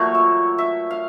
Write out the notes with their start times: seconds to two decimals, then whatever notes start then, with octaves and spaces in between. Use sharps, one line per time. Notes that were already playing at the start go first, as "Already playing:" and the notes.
Already playing: A#2 F#3 A3 C#5
0.15 E5
0.58 E5
0.91 F5